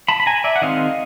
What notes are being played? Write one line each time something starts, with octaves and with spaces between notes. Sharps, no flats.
A5 B5
B5
G#5 A#5
D5 E5
F#5
D#3 G#3 C4 D#5 F5